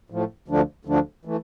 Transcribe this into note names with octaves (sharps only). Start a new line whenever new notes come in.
A2 F3 A3
D2 D3 F3 A3 D4
D2 D3 F3 A3 D4
E3 A3